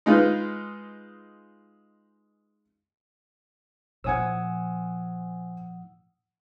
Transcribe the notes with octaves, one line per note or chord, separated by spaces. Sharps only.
G#3 D#4 F4 B4
A#2 F3 C5 F#5 G#5 D#6 E6 G#6